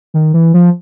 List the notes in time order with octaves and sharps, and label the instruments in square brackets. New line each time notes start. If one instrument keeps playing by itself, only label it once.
[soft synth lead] D#3
E3
F3